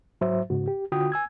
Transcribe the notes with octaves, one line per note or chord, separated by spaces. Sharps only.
G#2 F#3 C5 E5
G#2 C#3 F#4
G4
D3 F4 F#4 G5 D#6
G#5 E6 G#6